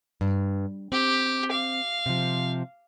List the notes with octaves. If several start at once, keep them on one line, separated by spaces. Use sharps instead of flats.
G2
C4 G4
F5
C3 F3